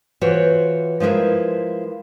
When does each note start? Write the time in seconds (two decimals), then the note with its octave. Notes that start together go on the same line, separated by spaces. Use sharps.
0.21 E3 F4 F#4 C5 C#5
1.00 F3 G#3 E4 A#4 B4